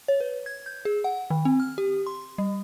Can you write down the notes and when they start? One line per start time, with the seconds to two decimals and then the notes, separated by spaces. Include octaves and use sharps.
0.08 C#5
0.20 B4
0.46 G#6
0.66 G6
0.85 G#4
1.04 F#5
1.30 D#3
1.45 C4
1.60 F6
1.78 G4
2.06 C6
2.38 G3